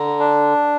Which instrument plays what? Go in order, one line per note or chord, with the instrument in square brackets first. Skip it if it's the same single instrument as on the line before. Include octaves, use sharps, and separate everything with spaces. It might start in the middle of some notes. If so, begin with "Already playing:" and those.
Already playing: [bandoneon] D3 [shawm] A#5
[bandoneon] D4